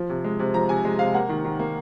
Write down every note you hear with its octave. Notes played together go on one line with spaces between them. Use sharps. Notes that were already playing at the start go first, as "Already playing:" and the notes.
Already playing: F3
C3
G#3
C3
F3 A#5
C3 G#5
G#3
C3 F5
A#3 F#5
D#3
D#3
A#3